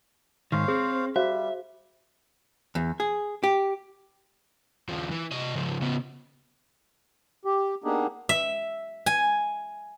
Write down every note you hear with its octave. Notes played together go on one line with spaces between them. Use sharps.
G#2 D#3 C5 C#5 F5
C4 G#4
G3 F#4 C5 E5 F5
E2
G#4
G4
D#2 F3
E3
C3 D#5
C#3 F3
C#3 B3
G4
A#3 B3 D4 D#4 G4 G#4
E5
G#5